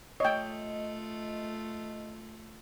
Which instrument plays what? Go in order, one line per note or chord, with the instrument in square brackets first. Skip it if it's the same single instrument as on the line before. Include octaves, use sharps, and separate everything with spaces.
[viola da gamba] A3 F4 [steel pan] C#5 G5 [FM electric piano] D#5